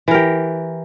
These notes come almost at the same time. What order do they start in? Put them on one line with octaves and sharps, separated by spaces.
E3 A#4 G4